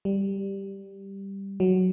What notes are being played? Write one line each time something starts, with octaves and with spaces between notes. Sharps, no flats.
G3
F#3